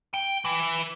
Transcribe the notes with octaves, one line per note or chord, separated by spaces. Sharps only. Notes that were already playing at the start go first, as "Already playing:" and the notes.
G5
E3